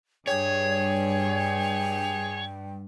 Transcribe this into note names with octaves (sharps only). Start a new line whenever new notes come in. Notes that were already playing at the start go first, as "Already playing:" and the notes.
G2 G#4 C#5 G5 G#5